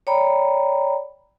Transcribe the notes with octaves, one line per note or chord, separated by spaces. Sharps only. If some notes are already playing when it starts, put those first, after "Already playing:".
C#5 D5 G5 A#5 B5